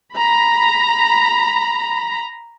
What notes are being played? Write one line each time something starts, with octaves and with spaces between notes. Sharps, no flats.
A#5 B5